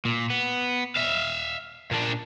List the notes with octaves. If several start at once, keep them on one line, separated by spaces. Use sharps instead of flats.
A#2
B3
E5 F5
A#2 D4